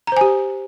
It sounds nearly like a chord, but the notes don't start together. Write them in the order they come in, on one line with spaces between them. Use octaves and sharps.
A#5 C5 G#5 G4